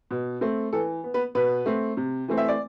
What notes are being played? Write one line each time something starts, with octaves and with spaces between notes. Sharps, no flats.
B2
A3 C4
E3 A4
B3
B3 B4
B2 B3 B4
A3 C4
C3
E3 A3 C4
E5
D5